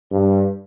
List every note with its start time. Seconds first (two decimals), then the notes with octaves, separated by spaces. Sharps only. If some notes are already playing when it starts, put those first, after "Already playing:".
0.11 G2